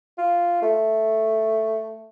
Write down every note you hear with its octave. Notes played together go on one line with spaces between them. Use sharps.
F4
A3